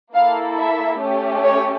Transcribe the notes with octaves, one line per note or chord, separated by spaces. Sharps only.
A#3 E4 A4 F5
E5
A3 C#4 G4
C#5